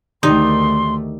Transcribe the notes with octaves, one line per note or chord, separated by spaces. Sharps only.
D2 D#3 A3 D#4 G4 D5 C6